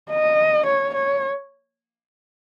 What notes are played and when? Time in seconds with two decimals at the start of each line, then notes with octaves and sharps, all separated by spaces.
0.11 D#5
0.67 C#5
0.95 C#5